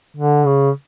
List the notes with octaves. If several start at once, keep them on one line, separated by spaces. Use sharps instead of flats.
D3
C#3